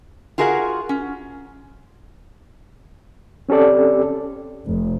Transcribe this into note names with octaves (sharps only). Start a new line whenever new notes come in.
F4 F#4 G#4 A#4 D#5 F#5
C#4
C4 C#4 G4 A4 D5
F1